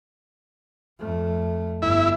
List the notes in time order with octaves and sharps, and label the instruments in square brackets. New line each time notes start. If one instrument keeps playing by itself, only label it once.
[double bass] F2 A3
[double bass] G1 [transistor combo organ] E4